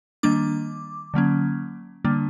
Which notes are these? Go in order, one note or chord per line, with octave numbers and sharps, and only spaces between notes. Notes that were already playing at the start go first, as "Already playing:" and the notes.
D#3 G3 A#3 D4 D6
D3 F#3 A#3 C#4
D3 G3 A#3 D4